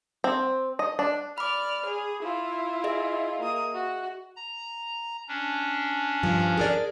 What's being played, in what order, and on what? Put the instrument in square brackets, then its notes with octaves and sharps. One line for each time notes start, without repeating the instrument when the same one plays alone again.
[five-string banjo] C4
D#5
D4
[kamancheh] D5 F6 [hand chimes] B5 D6
[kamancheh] G#4
E4 F4
[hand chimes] G#4 D#5 E5
[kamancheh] A#3 D#6
F#4
[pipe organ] A#5
C#4 D4
[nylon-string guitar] G2 F3
G#4 A#4 D5